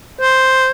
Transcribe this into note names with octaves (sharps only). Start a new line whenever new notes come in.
C5